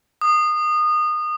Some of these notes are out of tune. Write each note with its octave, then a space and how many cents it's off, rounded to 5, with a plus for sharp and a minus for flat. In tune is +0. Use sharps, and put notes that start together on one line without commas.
D#6 -25